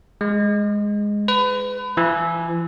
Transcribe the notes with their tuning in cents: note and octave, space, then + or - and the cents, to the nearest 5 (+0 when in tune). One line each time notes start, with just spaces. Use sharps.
G#3 -5
B4 +30
E3 +40